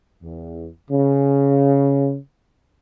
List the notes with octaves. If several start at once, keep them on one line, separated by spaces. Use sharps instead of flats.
E2
C#3